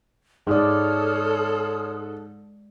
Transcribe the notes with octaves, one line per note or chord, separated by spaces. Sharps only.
G#2 G#3 A4 C#5 D5 D#6 F6